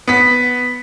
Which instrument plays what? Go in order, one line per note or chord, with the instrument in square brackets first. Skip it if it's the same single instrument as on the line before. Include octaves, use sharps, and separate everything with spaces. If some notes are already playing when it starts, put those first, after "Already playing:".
[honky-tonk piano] B3 B6